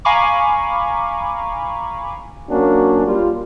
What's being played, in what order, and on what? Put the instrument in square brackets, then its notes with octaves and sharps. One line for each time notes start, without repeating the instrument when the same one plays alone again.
[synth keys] F5 G#5 A#5 B5 C#6 D6
[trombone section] F#3 A#3 C#4 D4 F#4
G3 A#3 F4